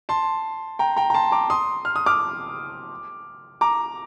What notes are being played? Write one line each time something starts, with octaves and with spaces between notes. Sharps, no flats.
A5 C6
G5 A#5
G5 A#5
A#5
A5 C6
A#5 D6
C6 D#6
F6
D#6
D6 F6
A#5 D6